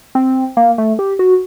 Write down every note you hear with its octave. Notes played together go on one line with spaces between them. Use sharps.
C4
A#3
A3
G4
F#4